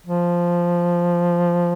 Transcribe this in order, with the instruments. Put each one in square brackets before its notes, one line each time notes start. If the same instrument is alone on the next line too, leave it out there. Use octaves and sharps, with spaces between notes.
[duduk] F3